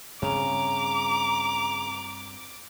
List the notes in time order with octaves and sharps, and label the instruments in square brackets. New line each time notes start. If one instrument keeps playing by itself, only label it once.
[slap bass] G2 C4 [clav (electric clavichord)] C#3 [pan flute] A#5 [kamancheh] D6